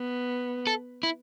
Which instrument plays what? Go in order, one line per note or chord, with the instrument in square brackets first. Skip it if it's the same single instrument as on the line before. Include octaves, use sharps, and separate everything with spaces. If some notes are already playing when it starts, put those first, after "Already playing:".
Already playing: [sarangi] B3
[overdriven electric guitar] A4
E4